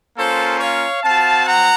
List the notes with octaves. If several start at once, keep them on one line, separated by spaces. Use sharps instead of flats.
A#3 C#4 F4 A4 C5
C#5 F5
C4 F#4 F5 A5
F#5 A#5